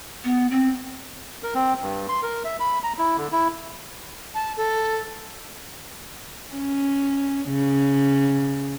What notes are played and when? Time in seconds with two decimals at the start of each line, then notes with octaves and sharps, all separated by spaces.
0.24 B3
0.51 C4
1.43 A#4
1.55 C4
1.82 G2
2.09 C6
2.23 A#4
2.45 E5
2.60 B5
2.84 A#5
2.98 E4
3.17 D3
3.32 E4
4.34 A5
4.57 A4
6.53 C#4
7.49 C#3